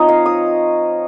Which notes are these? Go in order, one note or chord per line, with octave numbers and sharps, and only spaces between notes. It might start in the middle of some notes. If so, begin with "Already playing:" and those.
Already playing: F3 C4 D#4 C#5 D#5
F5
D#6